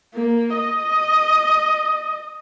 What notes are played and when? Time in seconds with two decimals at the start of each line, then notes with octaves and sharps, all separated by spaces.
0.14 A#3
0.56 D#5